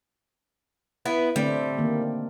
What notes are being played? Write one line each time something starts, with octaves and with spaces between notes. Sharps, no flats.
B3 E4 B4
D3 G3 A3 C4
D#3 A#3